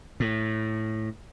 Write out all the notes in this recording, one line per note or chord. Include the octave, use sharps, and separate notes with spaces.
A2